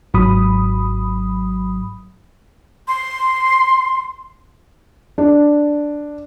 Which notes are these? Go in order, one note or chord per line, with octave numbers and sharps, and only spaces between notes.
G#1 G#2 F#3 B5 D#6
C6
D4